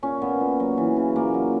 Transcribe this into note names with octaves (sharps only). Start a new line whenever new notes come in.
A#2 C#4
A#2 B3
A#2
F#3
E3
C#3
A#2 A#3
F#3